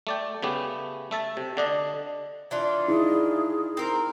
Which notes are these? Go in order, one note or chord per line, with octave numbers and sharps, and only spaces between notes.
A3 D5 G5
C#3 A3 B3 G4
A3 E5 A5
C3
D3 D4 D#5
E3 D4 F4
D#4 E4 G#4
C4 A#4